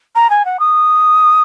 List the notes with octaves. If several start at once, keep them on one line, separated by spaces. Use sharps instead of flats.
A#5
G#5
F#5
D#6